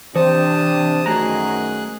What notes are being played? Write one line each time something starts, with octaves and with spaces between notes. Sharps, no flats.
C3 E3 D4 C5 D5 A5 D#6
F#2 D#3 F#3 A3 G#4 A#5 F#6